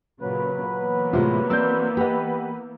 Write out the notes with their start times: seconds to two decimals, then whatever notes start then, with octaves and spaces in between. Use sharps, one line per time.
0.21 A#2 C#3 F#3 B4
0.76 E3 A#3 B3
1.13 A2 C3 G#3 F4
1.50 C4 D5 E6 G6
1.97 G4 B4 D#5 F#5 B5